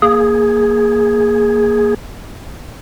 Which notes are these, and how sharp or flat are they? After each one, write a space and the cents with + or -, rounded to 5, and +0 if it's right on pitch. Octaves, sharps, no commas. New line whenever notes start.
A#3 +0 G#4 +0